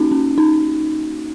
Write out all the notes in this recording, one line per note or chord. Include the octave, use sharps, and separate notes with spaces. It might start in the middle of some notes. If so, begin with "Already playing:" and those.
Already playing: A#3 C#4 D#4 F#4
C#4
D#4